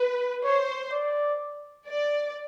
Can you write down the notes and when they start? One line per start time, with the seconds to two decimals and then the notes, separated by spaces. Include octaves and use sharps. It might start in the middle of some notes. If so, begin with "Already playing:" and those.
Already playing: B4
0.44 C5 C#5
0.92 D5
1.87 D5